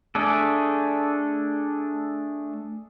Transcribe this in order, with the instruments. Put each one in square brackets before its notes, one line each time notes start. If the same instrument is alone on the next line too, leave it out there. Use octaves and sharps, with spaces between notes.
[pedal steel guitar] A3 D4 G#4 A4